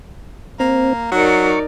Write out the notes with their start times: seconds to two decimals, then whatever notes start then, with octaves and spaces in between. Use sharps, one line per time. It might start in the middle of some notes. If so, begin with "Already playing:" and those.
0.60 A#3 C4
1.12 F#3 D#4 A#4 D5 C#6